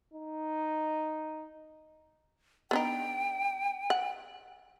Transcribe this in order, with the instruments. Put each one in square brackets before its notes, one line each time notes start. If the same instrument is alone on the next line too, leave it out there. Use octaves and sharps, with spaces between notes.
[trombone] D#4
[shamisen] B3 D4 D#4 [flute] G5
[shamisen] F#5